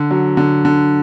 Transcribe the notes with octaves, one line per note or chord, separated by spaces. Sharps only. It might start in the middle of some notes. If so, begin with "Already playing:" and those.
Already playing: D3
F#3
D3
D3